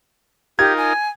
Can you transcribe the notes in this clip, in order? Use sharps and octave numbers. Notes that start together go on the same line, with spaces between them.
D#4 F4 G4 A#4 G#6
G#5